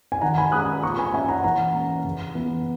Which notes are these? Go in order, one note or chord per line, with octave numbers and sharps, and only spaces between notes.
G#5
D#3 F#5 A#5
G#5 B5
G#3 C#4 D#6 F#6
A#2 A#5 C#6
G#5 B5
A#3 C#4 E5 G#5
F#5 A#5
E3 F#5 A#5
A#3 C#4
C#3
E3 B3